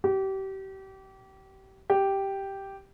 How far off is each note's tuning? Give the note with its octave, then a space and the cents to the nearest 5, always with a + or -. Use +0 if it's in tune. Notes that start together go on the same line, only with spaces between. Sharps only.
G4 -30
G4 -5